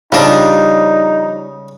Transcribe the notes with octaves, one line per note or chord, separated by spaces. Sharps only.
C#3 F3 G3 D4 D#4 G#4 A#5